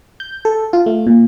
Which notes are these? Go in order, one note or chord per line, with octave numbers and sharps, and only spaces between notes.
G6
A4
F4
A3
A#2